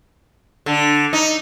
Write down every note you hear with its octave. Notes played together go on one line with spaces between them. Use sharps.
D3
D#4